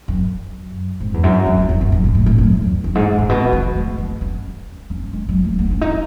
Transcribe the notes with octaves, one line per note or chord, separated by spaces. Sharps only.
F#2
G#2
E2
F#2
F#2
E2
F#2
E2
F#2
A2
A2
A2
F#2
E2
F#2
G#2
A2
B2
D#3
A3
B3
C#4
C#4
G#3
F#3
A3
B3
C#4
D#4